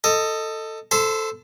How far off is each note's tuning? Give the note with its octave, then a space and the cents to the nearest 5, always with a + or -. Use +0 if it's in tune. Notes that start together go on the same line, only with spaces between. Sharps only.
A4 +15 D#5 +0
A4 +0 C5 +0 B5 +45